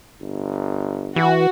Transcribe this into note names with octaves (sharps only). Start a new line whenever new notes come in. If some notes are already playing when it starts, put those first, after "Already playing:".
G1
E3 F#4